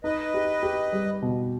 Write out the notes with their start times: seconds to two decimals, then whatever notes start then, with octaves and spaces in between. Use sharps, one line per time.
0.04 D#4 B4 D#5
0.34 G4
0.63 G4
0.93 G3
1.22 B2